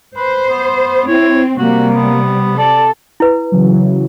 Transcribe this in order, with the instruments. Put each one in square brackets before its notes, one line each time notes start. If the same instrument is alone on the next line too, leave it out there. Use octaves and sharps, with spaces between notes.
[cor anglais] B4 [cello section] C5
[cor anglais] B3
[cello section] C4 [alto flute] E4 [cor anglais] C#5
[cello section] C3 G3 [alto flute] A#3 [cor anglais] F#4
[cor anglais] B3
[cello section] A4 [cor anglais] D5 [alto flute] A5
[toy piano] E4 B4
[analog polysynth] C#3 E3 F#3